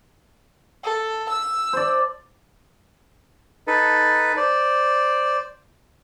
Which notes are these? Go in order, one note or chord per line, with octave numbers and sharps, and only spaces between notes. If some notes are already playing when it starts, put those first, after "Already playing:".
A4
E6
C5 D5
D#4 A4 B4
C5 D5